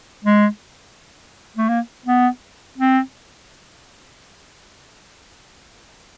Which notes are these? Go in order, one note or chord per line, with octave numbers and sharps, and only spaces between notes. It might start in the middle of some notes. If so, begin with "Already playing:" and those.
G#3
A3
A#3
B3
C4